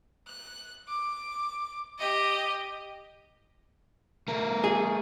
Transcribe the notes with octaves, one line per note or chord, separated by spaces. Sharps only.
F#6
D6
G4 D#5
A3 A#4
G#4